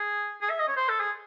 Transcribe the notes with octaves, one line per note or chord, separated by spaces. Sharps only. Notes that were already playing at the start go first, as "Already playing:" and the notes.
Already playing: G#4
G#4
E5
D#5
C#5
C5
A4
G#4